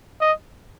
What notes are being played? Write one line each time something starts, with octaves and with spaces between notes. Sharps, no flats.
D#5